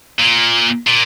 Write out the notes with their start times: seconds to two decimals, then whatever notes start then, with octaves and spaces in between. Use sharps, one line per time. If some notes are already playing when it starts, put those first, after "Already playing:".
0.19 A#2
0.87 A#2